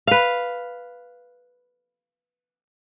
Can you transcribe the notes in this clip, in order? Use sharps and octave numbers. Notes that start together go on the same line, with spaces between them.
B4 F5